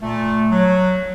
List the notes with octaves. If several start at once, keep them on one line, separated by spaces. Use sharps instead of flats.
A#2 A3
F#3